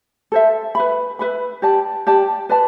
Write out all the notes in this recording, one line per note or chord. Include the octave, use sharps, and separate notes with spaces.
A4 C5 E5
B4 E5 B5
B4 E5 B5
G4 D5 A5
G4 D5 A5
B4 D5 A5